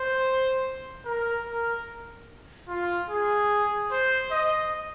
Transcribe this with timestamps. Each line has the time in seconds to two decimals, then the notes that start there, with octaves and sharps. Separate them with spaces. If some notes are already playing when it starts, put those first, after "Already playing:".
Already playing: C5
1.05 A#4
1.45 A#4
2.68 F4
3.10 G#4
3.91 C5
4.31 D#5